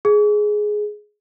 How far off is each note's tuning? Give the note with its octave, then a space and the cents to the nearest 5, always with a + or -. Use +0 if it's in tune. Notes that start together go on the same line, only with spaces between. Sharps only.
G#4 +10